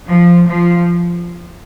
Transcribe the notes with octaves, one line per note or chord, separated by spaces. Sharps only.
F3
F3